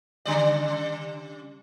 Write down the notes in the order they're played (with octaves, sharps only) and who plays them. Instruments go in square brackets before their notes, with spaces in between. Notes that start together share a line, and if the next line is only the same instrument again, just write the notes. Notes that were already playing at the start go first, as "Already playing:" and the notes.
[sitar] C#3 G3 D5